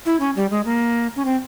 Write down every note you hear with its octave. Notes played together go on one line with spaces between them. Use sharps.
E4
C#4
G3
G#3
A#3
C#4
C4